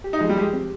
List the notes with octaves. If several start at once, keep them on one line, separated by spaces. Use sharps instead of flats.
G4
D#4
F3 G#3
G3
G#3 G4
C4